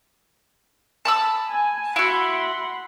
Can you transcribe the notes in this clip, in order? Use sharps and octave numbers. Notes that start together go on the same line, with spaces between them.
A5 B5 E6
G#5
E4 F#4 F#5 B5 C6